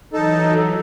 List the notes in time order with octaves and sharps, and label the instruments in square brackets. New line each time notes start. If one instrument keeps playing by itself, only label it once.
[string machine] E3 F#3 [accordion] D#4 A4